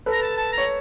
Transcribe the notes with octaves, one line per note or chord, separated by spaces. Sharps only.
A4 B4
A#5
A5
A5
A#5
C#5